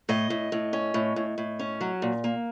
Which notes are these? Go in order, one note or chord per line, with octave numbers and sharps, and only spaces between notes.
A2 D#5
A2
A2
C#4
A2
A2
A2
C#4
F#3
A#2
A#3